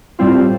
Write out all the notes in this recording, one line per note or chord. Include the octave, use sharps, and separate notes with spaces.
A2 G3 C4 F4